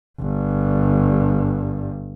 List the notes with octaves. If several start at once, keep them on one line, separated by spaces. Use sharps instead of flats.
G1 G2